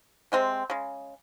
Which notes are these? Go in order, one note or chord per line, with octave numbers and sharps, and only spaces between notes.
C3 G#3 C4
C#3 G#3